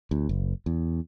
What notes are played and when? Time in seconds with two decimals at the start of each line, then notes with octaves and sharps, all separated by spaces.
0.11 D2
0.29 F#1
0.66 E2